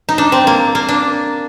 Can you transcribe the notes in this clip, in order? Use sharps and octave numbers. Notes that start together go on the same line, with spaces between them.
D#4
D4
C4
A#3
A#3
D4